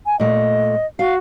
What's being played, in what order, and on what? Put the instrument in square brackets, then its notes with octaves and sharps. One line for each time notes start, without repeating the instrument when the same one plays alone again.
[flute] G#5
[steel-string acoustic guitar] A#2 A3 [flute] D#5
[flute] F#4 [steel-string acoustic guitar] F5